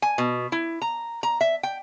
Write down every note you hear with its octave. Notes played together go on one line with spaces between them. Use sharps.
G#5
B2
E4
A#5
A#5
E5
G5